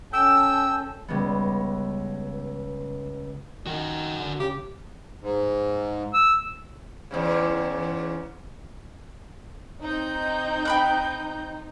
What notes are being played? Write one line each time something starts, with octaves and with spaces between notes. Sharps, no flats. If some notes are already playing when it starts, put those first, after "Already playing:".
C#4 A4 G5 E6
C#2 G3 B3
D#3 F#4 A#4
D3
C#3 G4
G#2
E6
E2 G#2 C#3
C4 D#4 G6
G5 B5 F#6